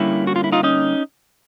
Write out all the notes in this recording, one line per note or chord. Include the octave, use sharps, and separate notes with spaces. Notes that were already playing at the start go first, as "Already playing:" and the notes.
Already playing: D3 G3 A#3 C#4 E4
F#4
F4
E4
D#4 F4
C#4 D#4